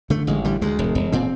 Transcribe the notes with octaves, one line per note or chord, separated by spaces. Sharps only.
D3 A3
A1 G#3
D3 G3
D2 G#3
E1
E1
A#2 C4